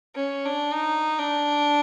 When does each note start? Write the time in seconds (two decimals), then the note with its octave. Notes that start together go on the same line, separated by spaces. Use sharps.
0.15 C#4
0.45 D4
0.74 D#4
1.18 D4